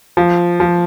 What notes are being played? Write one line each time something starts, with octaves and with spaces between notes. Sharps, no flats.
F3
F3